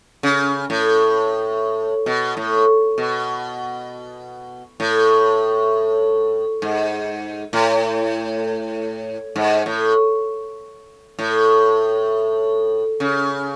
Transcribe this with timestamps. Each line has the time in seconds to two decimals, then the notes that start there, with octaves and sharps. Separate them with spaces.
0.23 C#3
0.70 A2
2.06 B2
2.37 A2
2.98 B2
4.80 A2
6.62 G#2
7.53 A2
9.36 G#2
9.66 A2
11.19 A2
13.00 C#3